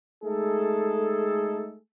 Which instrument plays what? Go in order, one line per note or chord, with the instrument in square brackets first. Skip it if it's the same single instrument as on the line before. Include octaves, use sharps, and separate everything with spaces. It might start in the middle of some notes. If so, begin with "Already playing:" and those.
[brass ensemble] G#3 A3 D#4 G#4 A4